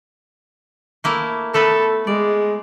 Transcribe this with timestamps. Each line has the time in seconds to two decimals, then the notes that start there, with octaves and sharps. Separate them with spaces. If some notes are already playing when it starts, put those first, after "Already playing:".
1.04 A3 A#3 E4
1.54 A3 B3 A4 B4
2.07 G#3 D5